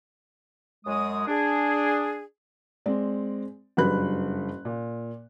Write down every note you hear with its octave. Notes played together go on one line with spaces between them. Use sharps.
F#2 G#3 D#6
D4 G#4
G#3 C4 D5
F#1 G2 F#3 B4 B5 F#6
A#2